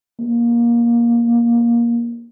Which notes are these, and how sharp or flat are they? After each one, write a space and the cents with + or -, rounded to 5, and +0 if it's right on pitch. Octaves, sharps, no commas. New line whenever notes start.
A#3 +15